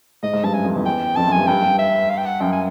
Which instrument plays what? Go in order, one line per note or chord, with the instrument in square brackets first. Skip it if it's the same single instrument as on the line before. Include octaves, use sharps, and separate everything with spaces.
[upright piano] G#2 [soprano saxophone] D#5
[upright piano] G#2
[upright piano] G2 [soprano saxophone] A5
[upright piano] F#2 [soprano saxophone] G#5
[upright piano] F2
E2
[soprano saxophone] G5
[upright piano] F2 [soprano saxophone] A5
[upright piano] F#2
[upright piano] G2 [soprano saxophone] G#5
[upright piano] G2 [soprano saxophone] G5
[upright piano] G2
[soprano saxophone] E5
F5
G5
F#5
[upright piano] F#2 [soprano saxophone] G5
[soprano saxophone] G#5